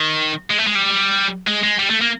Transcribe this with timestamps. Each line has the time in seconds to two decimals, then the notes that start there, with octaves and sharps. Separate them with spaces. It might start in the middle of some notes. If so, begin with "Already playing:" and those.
Already playing: D#3
0.50 G#3
0.58 A3
0.67 G#3
0.75 G3
1.47 G#3
1.63 G#3
1.79 G3
1.90 A3
2.02 A#3